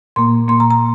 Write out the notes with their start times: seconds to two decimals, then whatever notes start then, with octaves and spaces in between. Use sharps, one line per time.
0.16 A#2 A#3 C6
0.48 A#2 A#3 C6
0.60 A#5
0.71 A#5